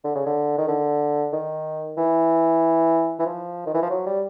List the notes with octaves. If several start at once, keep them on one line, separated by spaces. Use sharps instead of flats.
D3
C#3
D3
D#3
D3
D#3
E3
E3
F3
D#3
E3
F3
F#3
G3